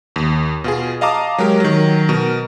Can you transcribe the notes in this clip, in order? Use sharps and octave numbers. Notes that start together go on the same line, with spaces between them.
D#2
B2 F4 G#4
D#5 F5 A5 A#5 D6 D#6
F#3 G#3 G4 A#4
D#3 F#3
B2 A#4